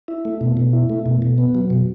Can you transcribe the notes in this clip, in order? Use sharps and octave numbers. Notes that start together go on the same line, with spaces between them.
E4
A3
B2
B2
E4
A3
B2
B2
B3
F#3
B2